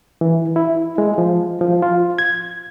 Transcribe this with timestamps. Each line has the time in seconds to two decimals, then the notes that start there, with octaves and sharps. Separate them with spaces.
0.21 E3
0.56 E4
0.98 G#3
1.18 F3
1.61 F3
1.82 F4
2.19 G#6